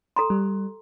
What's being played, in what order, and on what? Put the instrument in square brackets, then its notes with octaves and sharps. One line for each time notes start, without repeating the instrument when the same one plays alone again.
[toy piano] A4 A#5 C6
[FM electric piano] G3